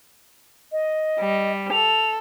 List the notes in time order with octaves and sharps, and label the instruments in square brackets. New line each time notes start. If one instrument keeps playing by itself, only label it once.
[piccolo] D#5
[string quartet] G3
[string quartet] A4 [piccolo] F7